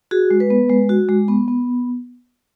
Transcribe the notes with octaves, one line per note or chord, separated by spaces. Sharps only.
F#4 G#4
G#3
B4
B3
G#3
F#4
G#3
B3
B3